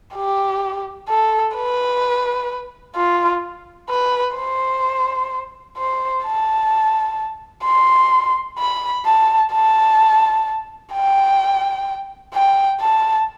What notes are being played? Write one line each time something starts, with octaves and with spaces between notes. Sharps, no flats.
G4
A4
B4
F4
B4
C5
C5
A5
C6
B5
A5
A5
G5
G5
A5